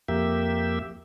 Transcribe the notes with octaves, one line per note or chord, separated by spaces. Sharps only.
F2 A#3 G4 E5